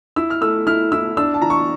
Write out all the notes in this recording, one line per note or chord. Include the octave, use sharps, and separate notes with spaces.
E4 E6
F6
A3 E6
E4 F6
E4 E6
D4 E6
A5
E3 A#5
C#6